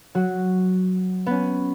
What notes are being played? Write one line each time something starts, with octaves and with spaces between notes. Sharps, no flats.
F#3 F#4
B3 C#4